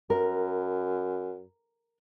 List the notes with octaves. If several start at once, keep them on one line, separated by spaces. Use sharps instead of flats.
F#2 A#4